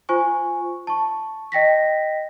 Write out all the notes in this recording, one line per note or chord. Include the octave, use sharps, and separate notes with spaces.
F4 C5 G#5 C#6
A5 C#6
D#5 G5 A#6 B6